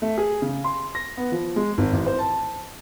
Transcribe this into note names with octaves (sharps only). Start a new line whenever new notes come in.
A3
G#4
C#3
C6
A#6
B3
F3
G#3
G#1
A1
C5
A5